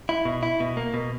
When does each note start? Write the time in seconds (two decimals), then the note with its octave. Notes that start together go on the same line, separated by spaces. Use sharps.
0.09 E4
0.25 B2
0.43 E4
0.60 B2
0.77 A#3
0.94 B2